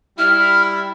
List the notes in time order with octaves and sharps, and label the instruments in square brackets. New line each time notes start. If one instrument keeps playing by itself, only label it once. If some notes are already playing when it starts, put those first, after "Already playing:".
[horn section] G3 E4 [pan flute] F6